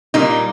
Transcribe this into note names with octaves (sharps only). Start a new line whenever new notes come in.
A#2 G3 A#3 D#4